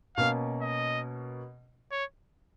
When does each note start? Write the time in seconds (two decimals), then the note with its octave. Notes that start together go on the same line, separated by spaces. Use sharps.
0.17 B2 A#3 C#4 F5
0.62 D#5
1.91 C#5